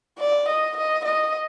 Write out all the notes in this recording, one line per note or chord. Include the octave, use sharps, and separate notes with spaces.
D5
D#5
D#5
D#5